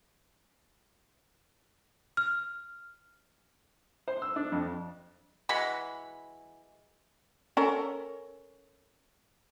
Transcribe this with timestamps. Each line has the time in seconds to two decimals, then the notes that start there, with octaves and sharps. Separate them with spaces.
2.17 F6
4.08 C5
4.22 E6
4.36 D4
4.52 F2
5.49 E3 G#3 F#4 B5
7.57 C#4 A4 A#4